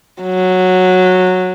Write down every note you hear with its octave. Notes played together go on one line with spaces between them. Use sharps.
F#3